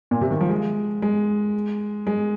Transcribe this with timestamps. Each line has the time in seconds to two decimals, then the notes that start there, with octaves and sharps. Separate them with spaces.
0.11 A#2
0.21 C3
0.31 D#3
0.41 F3
0.49 G#3
1.02 G#3
2.07 G#3